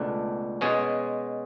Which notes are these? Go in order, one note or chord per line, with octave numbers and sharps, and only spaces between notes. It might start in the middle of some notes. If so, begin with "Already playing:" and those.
Already playing: C#2 B2 A3 D4
B2 G#3 C#4 G#4